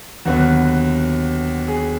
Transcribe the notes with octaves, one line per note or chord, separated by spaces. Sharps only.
D#2 D3 F#3 B3 F#4
G#4